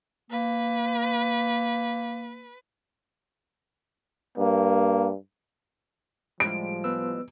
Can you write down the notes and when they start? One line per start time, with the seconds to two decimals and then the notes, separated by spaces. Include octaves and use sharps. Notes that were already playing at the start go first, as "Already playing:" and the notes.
0.30 A#3 B4
4.38 G2 A#3
6.40 A2 F3 G3 G#3 D7
6.84 B3 B4 E6